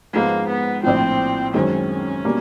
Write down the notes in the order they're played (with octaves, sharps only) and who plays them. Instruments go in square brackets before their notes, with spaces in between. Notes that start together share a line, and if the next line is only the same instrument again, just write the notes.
[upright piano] G#2 F3 G#3 B3 [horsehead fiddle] A#3
[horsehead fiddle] B3
[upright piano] A#1 A2 F3 [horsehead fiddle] C4
[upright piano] F#2 D#3 G#3 C4 [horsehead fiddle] C#4
[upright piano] B2 G3 A#3